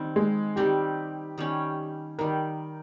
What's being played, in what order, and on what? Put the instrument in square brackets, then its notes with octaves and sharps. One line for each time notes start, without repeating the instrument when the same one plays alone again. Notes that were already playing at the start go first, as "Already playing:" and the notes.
Already playing: [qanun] D#3 G3 C4
[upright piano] G#3
[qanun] D#3 G3 C4 [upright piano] G4
[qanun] D#3 G3 C#4
[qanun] D#3 G3 [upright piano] A#4